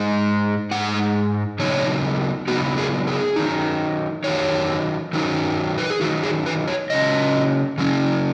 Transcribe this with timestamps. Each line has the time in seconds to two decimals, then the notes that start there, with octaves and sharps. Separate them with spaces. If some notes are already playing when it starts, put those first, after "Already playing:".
Already playing: G#2 G#3 D#4
0.71 G#2 G#3 D#4 F#5
1.59 C#3 F#3 B3 D#4 C#5
2.48 C#3 F#3 B3 D#4 F#4
2.78 G#4
3.07 G#4
3.36 D#3 F#3 D#4
4.24 D#3 F#3 D#4 C#5
5.13 D#3 F#3 D#4
5.78 B4
5.90 G#4
6.01 D#3 F#3 D#4 F#4
6.23 G#4
6.46 B4
6.68 C#5
6.90 C#3 F#3 C#4 D#5
7.78 C#3 F#3 C#4